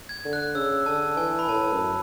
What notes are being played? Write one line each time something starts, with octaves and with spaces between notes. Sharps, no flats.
G#6
D3
F#6
C#3 E6
D3 A5
E3 G#5
B5
A2 A5
F#2